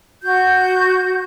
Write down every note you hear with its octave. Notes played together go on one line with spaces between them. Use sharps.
F#4 G6